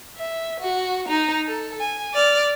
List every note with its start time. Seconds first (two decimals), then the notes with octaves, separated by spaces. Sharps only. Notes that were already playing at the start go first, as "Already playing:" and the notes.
0.17 E5
0.60 F#4
1.08 D#4 A#5
1.46 A4
1.80 G#5
2.14 D5 F6